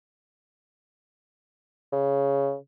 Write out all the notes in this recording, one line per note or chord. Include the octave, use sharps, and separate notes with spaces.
C#3